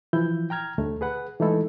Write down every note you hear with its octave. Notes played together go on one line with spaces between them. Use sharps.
E3 F3 E4 G6
G5 A#5 F6 G#6
D2 A3
G#4 B4 F#5
E3 G#3 A3 D#4 E4 A4